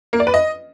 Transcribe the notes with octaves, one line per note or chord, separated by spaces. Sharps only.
A#3
D5
B4
D#5